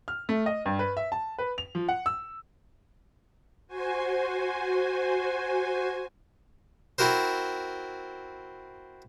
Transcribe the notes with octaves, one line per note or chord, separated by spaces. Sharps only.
F6
A3
D#5
G2
B4
E5
A5
B4
F7
F3
F#5
E6
F#4 C5 G#5
C4 E4 F#4 A#4 C5